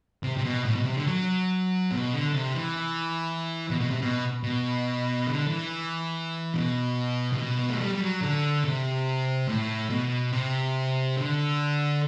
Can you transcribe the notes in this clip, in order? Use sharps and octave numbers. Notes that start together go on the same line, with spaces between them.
C3
C3
B2
A2
B2
C3
D3
F#3
B2
D3
C3
E3
B2
B2
C3
B2
B2
D3
E3
B2
C3
B2
B3
A3
G3
G3
F#3
D3
C3
A2
B2
C3
D3